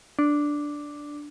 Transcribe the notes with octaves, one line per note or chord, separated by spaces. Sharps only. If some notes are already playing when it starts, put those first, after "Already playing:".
D4